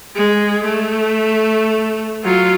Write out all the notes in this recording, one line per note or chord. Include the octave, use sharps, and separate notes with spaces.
G#3
A3
F#3 F4